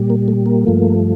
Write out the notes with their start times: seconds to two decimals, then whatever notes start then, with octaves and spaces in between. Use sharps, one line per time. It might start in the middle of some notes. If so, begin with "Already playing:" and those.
Already playing: A#2 G3
0.10 A#3
0.28 A3
0.46 A#3
0.64 G2 F3 A3